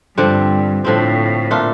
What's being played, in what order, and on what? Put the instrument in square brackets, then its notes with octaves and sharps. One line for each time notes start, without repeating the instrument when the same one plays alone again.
[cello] G2 [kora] D3 F3 C4
[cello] A2 [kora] D3 F3 C4
[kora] A#2 A3 D4 F4